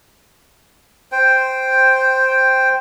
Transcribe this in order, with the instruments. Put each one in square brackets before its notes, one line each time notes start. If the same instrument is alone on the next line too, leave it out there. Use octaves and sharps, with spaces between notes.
[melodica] C5 G5